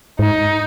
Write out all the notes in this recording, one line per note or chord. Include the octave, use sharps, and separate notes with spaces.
G#2 D#4